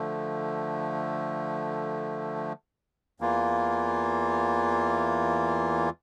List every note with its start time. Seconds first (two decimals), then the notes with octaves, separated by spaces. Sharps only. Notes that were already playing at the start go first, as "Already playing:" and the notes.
Already playing: D3 F3 A3
3.20 E2 E3 A#3 F4